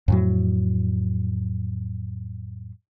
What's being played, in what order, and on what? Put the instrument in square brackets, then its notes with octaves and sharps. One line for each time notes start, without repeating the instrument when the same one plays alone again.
[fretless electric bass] F2 A2 F#3